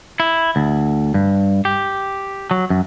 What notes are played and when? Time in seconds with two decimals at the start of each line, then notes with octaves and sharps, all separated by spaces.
0.20 E4
0.56 D2
1.14 G2
1.65 G4
2.51 F#3
2.70 F#2